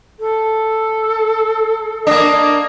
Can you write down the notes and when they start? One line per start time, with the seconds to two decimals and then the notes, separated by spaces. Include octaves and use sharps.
0.19 A4
2.07 A#3 D4 D#5